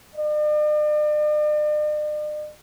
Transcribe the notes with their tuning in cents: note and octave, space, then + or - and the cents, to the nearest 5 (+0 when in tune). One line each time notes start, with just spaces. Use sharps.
D5 +45